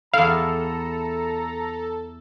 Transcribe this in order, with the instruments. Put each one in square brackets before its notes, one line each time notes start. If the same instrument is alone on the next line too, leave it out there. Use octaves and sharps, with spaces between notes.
[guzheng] E2 E4 [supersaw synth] A4 [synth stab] F5 [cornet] A#5